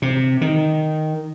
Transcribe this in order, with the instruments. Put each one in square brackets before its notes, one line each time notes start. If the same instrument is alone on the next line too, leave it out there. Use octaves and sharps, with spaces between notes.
[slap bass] C3
D#3